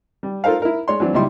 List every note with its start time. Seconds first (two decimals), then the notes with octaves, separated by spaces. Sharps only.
0.23 G3
0.44 F4 A4 A#4 C5 F5
0.62 E4 A#4
0.88 G#3 C#5 D5 C6
1.00 E3 F#3 C4 D4
1.13 C#2 A#2 G3 D#4 E4 C6